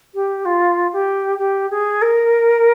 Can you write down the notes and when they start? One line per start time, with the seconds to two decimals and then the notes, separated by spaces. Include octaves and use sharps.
0.14 G4
0.45 F4
0.93 G4
1.39 G4
1.71 G#4
2.02 A#4